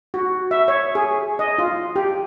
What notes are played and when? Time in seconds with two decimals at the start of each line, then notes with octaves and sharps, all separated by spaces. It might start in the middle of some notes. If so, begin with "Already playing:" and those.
0.14 F#4
0.51 E5
0.68 C#5
0.95 G#4
1.39 D#5
1.58 F4
1.96 G4